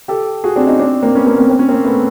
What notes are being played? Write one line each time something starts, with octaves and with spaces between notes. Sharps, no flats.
G4 A4
F#4 G#4
C4 D4
C#4 D#4
C4 D4
A#3 C4
B3 C#4
A#3 C4
A#3 C4
C4
C#4
A#3 C4
A3 B3